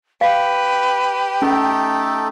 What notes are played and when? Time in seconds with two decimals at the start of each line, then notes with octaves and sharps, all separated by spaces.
0.21 G4 B4 F5
1.42 A3 C#4 D#4 A4